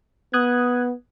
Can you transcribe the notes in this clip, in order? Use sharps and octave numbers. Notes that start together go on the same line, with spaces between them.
B3 D#6 F#6 G#6